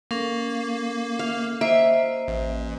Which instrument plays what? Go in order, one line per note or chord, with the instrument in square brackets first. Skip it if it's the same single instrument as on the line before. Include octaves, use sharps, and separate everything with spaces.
[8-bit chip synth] A#3 [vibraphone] C#4 A4 A#4
[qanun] F5
[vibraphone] A#3 C5 D#5 [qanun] E5
[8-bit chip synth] A1